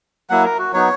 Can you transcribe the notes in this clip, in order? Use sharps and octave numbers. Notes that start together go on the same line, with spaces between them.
F#3 A#3 E4 F#5
A#4
F#4
F#3 B3 D#4 F#4 C#5